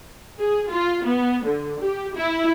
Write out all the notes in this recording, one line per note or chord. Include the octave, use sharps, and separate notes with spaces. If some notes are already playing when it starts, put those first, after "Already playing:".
G#4
F4
B3
D3
G4
E4